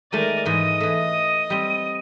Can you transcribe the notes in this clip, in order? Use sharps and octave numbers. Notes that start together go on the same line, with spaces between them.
D#3 G#3 A3 A#4 D5 D#7
G#2 E3 D#5
E3 A3
D#7
G3 C4